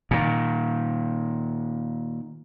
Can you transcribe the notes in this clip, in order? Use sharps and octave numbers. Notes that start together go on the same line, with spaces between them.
A#2 D#3